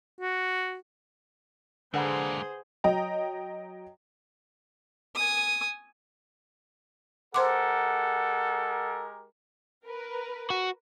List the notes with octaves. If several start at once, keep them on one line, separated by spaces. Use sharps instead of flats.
F#4
D3 G#3 A#3 G#4 B4 C5 F#5 B5
F#3 D#5 G5 A#5
G#5 D#6
G#3 G4 A4 A#4 C5 F#5 C6 D6
A#4 B4
F#4